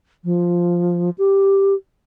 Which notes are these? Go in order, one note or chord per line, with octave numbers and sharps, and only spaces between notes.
F3
G4